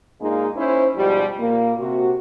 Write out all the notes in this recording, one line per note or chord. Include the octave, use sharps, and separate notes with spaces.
A#2 G#3 A#3 D#4 F4 G#4
C#4 D#4 E4 C5
G#2 B2 F3 G3
A#2 A#3
C3 F#4